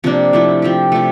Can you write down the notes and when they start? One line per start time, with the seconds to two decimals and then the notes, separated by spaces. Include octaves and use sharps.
0.04 C3 F3 A#3 D4
0.33 F3 A3 E4
0.62 F3 C4 G4
0.92 C3 F3 A3